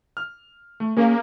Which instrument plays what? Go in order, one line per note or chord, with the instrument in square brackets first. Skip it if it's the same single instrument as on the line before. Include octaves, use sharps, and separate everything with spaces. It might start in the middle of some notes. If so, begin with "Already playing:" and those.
[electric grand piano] F6
A3
[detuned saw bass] A#3 [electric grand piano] C#4 G#4